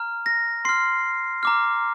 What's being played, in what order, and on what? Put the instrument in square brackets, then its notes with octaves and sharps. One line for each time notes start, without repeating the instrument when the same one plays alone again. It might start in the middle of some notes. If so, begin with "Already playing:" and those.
Already playing: [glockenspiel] A#5 F6
A#6
C6 F6 C7
A#5 D6 F6